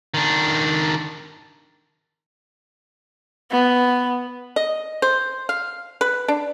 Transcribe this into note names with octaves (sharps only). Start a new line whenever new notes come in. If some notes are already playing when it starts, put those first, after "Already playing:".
D#3 D4
B3
D#5
C5
F5
B4
D4